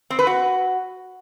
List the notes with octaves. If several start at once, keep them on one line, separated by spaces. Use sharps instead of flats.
C4
B4
F#4